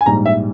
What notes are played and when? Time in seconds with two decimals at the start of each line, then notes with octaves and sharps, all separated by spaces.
0.01 G#5
0.06 A#1 G#2 G3 A#5
0.26 E5